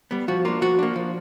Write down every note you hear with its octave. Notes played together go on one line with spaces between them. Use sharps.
G3 B3
F3 F#4
A#3 D4 F4
F3 F#4
A#3 D4
F3